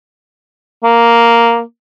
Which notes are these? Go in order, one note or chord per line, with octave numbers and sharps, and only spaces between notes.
A#3